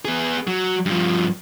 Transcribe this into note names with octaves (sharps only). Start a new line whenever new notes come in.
B3 G#4
F#3
G2 F3